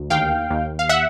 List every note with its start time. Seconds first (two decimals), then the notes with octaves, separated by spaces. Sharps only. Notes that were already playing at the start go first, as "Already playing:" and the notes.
Already playing: D2
0.10 D#2 F5 G5
0.50 D#2
0.79 F5
0.89 E5 F#5